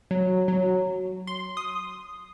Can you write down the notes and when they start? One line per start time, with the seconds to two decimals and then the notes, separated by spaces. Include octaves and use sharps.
0.11 F#3
0.48 F#3
1.27 C6
1.57 D#6